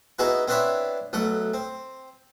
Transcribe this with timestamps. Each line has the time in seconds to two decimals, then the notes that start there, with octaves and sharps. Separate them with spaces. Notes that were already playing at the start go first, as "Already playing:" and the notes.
0.19 B3 D#4 E4 F#4 G#4 B4
0.48 B3 C4 D4 E4 C#5 B5
1.13 B1 A3 F#5
1.54 C4